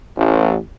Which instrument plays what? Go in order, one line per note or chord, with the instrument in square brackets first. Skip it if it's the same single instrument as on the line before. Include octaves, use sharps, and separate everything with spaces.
[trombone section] A1